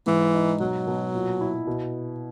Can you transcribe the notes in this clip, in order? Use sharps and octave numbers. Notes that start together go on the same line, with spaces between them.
G#2 E3
D#4
B2 F#3
B2
A#2
E4
B2